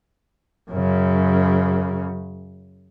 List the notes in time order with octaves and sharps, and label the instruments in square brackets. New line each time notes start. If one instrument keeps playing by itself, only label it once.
[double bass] F#2 C#3